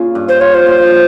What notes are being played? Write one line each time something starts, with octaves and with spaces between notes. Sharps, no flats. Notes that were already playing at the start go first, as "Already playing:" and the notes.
Already playing: A#2 C#3 F4
G2
C5
F4 C#5
C5
A#2